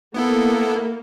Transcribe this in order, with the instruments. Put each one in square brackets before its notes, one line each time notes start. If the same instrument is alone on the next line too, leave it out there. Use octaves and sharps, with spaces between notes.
[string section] A#3 [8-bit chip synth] B3 E4 A4